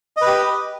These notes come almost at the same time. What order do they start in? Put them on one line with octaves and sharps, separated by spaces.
D#5 B4 G4